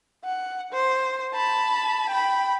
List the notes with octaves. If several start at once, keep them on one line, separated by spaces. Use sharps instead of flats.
F#5
C5
A5 B5
G5 B5